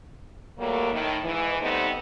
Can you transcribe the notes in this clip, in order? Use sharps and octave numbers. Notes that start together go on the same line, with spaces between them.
F#3 G3 A3 A#3
A2 D#3
G#2 E3
G3 A3 B3 C4 D#4